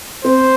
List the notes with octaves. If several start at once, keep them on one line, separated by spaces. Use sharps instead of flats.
C4 C5